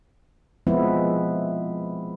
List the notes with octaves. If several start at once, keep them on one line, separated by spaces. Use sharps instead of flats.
F3 G#3 B3 C4 E4